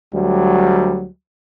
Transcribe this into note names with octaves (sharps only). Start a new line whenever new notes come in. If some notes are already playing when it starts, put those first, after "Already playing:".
D2 F#3 G3